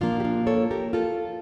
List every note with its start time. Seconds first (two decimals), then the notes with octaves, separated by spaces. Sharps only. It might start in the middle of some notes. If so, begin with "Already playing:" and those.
0.01 A#2 F3 A#3 D4 F4
0.20 G4
0.24 D4 F4
0.47 A4 C#5
0.71 G4 A#4
0.93 F4 A4